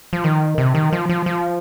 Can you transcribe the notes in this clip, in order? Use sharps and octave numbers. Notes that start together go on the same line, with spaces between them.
F3
D#3
C3
D#3
F3
F3
F3